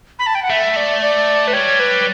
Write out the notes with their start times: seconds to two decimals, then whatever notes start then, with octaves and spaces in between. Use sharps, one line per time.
0.19 B5
0.27 A5
0.35 G5
0.43 F#5
0.50 A3 E5
0.76 D5
1.02 D5
1.48 B4
1.53 G3 C#5
1.80 B4